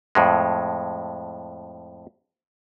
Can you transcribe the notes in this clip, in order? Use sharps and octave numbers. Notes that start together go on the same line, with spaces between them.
F2 A2 G#3